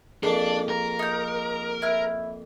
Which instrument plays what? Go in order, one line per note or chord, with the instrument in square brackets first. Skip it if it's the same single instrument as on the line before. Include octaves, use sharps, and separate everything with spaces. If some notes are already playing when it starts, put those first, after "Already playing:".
[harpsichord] F2 A#3 [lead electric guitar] D4 [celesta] G#4 [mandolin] F5
[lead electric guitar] A#4
[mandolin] D#4 G6
E4 F6